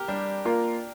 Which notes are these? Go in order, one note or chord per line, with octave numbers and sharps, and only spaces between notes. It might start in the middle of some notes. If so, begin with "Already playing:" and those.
Already playing: G4 A#4
G3 D4
A#3 F4 A#4